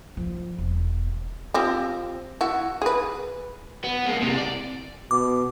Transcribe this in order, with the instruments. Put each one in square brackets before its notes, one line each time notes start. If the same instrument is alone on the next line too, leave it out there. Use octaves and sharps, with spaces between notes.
[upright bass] F3
E1
[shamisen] F3 C4 G4
E4 F#4
G#4 B4
[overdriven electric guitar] B3
G#3 A#3
C3 G3
D5
[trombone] B2 [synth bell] D6